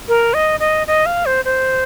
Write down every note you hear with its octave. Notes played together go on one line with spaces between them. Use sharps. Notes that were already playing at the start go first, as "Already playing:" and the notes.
A#4
D#5
D#5
D#5
F5
C5
C5